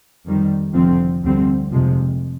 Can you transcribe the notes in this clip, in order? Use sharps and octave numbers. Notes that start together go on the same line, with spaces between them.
F2 D#3 G3
F1 F2 D3 F3 C4
D2 D3 G3 C4
F1 F2 C3 F3 G#3